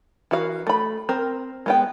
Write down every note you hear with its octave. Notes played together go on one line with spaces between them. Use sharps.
E3 F#4 A#4 F5
A3 B5
C4 A#4
G#3 B3 G5